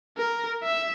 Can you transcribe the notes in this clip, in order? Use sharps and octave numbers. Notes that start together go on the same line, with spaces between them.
A#4
E5